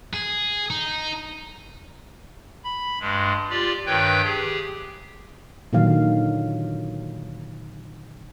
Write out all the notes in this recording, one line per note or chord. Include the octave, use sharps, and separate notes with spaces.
G#4
D#4
B5
G2 G#3
F4 G4 D5
G2 D#3 B4 C#5 G5 G6
G4 G#4
A#2 D3 D#3 F#3 F5